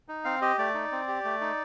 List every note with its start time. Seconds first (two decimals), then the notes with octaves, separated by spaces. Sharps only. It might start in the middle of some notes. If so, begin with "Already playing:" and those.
0.08 D#4
0.25 C4 F5
0.42 G4 D#5
0.58 A3 D5
0.74 D#4
0.92 C4
1.08 G4
1.25 A3
1.41 D#4